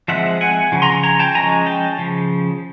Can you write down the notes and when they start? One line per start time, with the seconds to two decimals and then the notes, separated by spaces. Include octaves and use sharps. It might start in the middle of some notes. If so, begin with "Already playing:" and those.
0.08 F3 G#3 C4 E5 F#5
0.41 F#5 G#5
0.72 C#3 F3
0.82 A#5 C6
1.03 G#5 A#5
1.19 G5 A5
1.35 F3 G#3 C#4 G#5 A#5
1.66 G5 A5
1.98 C#3 F3